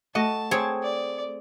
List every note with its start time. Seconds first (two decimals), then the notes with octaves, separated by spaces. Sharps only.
0.15 A3 F#4 D#5 A5
0.51 C4 G#4 C#5
0.83 D5